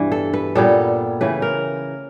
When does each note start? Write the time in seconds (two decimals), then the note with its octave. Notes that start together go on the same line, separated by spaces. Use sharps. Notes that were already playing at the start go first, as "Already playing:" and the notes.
Already playing: G2 B2 E3
0.12 A4
0.34 B4
0.55 A#2 G3 B3 A4
1.21 C#3 E3 A3 B4
1.42 A#4